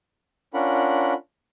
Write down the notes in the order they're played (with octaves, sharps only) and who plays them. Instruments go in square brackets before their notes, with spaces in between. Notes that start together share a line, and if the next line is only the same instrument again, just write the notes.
[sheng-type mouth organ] C#4 D4 F4 A#4 F#5 B5